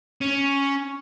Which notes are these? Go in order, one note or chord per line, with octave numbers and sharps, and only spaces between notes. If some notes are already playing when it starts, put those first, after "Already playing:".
C#4